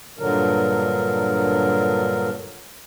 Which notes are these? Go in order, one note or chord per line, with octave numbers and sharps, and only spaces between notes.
G2 A#2 D3 F#3 A#4